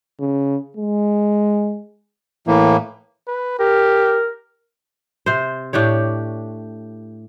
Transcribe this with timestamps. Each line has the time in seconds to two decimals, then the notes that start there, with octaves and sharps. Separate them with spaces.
0.20 C#3
0.77 G#3
2.47 A2 E3 A#3
3.27 B4
3.59 G4 A#4
5.26 C3 C5
5.73 A2 D4 G4 C#5